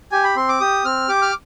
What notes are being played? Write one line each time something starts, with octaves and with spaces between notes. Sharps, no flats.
G4 G#5
B5
C4 C6
D6
G4 D#6
C4 F6
G4 D6
F6